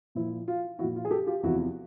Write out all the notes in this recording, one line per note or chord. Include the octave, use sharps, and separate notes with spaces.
A#2 F3 E4
F4
A#2 F3 E4 F#4
F4
G#4
G4 A4
F4 G4
E2 C3 F3 E4 F#4